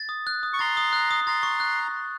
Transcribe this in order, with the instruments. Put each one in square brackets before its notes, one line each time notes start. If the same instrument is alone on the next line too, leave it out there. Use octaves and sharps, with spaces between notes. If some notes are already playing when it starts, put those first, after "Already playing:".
Already playing: [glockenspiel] A6
D#6
F#6
D#6
[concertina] C#6
[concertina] A#5 C6 [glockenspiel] A6
[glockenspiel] D#6
F#6
D#6
[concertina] A#5 C6 [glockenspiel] A6
[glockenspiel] C#6
F#6